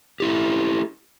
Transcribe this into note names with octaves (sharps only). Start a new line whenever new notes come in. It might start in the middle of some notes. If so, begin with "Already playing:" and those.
A3 E4 G4